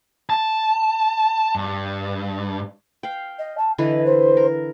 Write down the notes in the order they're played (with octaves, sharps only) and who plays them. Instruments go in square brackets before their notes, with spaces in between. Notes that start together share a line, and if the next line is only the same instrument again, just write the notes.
[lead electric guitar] A5
G2
[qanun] F5 G5
[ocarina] D#5
A5
[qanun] D3 E3 B4 [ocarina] D#5
[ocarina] C5
[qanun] A#4